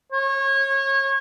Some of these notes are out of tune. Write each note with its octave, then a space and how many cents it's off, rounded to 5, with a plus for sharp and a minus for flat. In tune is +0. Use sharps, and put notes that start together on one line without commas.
C#5 -30